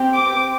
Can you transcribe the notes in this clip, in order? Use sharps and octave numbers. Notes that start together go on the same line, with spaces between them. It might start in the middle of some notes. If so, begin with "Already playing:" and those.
Already playing: C4 G4
D6